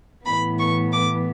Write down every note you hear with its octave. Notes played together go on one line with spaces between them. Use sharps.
A2 E3 B3 B5
C#6
D6